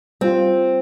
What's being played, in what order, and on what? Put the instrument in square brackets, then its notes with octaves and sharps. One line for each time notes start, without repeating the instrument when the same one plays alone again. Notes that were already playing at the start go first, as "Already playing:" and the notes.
[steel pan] G3 F4 [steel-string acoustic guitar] C4